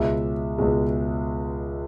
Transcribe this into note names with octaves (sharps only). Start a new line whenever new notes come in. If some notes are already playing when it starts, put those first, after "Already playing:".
Already playing: C#2 B2 G#3 E5
C#2 B2 G#3